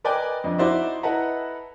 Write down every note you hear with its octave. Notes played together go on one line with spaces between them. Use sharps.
A#4 B4 D5 D#5 G5 G#5
F2 D4 D#5
D#4 E4 F#4 C5 D5 E5
E4 A4 B4 D#5 F#5 A#5